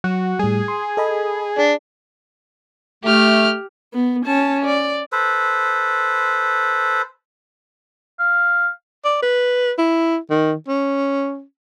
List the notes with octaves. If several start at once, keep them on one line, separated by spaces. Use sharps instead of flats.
F#3 F#4
A2 G3 G#4
C6
A4 D#5 B5
D4 G#4
A3 G4 F6
B3
C#4 A5
D5
A4 B4 C5
F5
D5
B4
E4
D#3
C#4